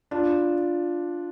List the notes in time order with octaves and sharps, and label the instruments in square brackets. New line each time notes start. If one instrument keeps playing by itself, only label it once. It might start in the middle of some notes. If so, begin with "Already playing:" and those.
[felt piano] D4 F4